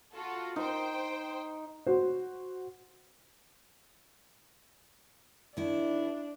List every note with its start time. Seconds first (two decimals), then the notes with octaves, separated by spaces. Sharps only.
0.15 F4 F#4 A4
0.56 D#4 C5 G5
1.86 F#4 C5
5.57 D#3 D4 E4